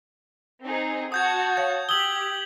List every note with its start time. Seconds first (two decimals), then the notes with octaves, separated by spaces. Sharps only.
0.64 C4 D#4 G#4
1.12 F#4 A5 D#6 G6 G#6
1.57 C#5 F5 G6
1.89 G4 D#6 E6 G#6 F#7 G7